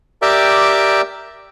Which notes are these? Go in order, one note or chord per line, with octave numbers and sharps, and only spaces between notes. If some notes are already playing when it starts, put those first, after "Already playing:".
G4 A#4 D5 E5 G5